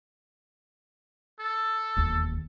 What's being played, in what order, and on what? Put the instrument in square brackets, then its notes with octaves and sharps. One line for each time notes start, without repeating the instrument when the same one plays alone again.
[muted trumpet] A4
[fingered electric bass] E1 D#2